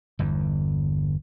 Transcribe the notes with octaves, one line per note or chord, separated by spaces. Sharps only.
G1 E2